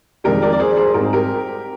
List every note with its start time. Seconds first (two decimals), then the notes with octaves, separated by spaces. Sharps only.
0.24 F2 D#3 G#3 D4 G4 A#4
0.42 A#4 D5
0.52 D5
0.60 G#4 C5
0.77 G#4 C5
0.94 G#2 G3 C4 A#4
1.05 G#4
1.13 G4 A#4